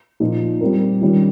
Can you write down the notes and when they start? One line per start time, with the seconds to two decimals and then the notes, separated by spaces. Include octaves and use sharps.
0.20 A#2 F3 A#3 D#4
0.60 G3 C4 F4 A#4
1.01 D#3 G3 C#4 F4